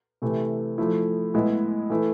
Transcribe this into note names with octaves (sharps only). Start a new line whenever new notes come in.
C3 E3 A3 E4
F3 A3 E4
A2 G#3 B3 E4
E3 A3 E4